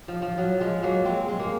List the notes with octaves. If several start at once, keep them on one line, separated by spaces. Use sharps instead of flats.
F3
F3
F#3
F3 G#3
F#3 A#3
G#3 C4
G#3
A#3